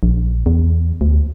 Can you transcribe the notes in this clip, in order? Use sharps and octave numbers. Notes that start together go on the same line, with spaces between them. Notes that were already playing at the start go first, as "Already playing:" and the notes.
A#1
E2
D2